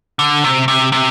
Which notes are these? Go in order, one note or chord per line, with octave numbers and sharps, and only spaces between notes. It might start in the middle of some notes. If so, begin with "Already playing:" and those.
D3
C3
C3
C3